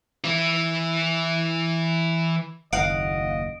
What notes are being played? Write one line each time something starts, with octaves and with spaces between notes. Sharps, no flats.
E3 E4
F#1 D#2 D#5 F5 F#5 D7